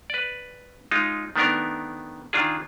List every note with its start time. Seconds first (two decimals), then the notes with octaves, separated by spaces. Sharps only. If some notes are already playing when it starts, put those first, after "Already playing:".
0.10 B4 D5
0.91 G#3 D#4 F4
1.36 D#3 A3 B3 D4 A#4
2.33 D#3 D4 F4 G#4